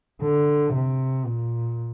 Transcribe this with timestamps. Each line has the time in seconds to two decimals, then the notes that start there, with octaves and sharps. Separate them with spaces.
0.22 D3
0.74 C3
1.26 A#2